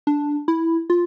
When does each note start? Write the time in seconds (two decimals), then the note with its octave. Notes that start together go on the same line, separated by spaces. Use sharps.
0.07 D4
0.48 E4
0.90 F4